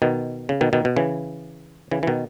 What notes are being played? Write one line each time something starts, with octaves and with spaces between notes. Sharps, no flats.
B2 D#3
C#3
B2 D#3
B2 D#3
B2
C#3 E3
C#3 E3
E3
B2 D#3